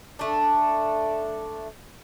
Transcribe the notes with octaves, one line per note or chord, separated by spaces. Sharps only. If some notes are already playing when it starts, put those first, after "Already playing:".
A3 D4